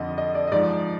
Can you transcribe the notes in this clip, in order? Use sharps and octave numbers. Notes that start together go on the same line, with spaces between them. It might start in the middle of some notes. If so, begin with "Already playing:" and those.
Already playing: F2 D3 F3 D#5 F#5
D#5
D5
D#5
G#2 F3 D5